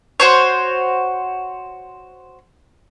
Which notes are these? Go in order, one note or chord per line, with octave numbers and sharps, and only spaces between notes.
F#4 C5 C#5